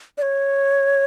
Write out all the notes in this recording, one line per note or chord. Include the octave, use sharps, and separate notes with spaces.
D5
C#5